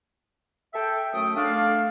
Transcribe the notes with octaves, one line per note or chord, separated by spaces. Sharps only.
A4 E5 G5
F#2 A3 G5 D#6
A3 D4 F5